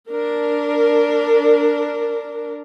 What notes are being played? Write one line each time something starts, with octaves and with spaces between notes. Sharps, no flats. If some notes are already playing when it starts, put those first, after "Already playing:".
D4 A#4